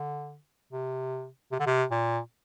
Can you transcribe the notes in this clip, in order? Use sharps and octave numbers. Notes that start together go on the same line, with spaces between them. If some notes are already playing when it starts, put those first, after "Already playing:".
Already playing: D3
C3
C3
D3
C3
A#2